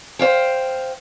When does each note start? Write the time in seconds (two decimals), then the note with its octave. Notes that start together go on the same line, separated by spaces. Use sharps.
0.19 C5 C#5 F5 G5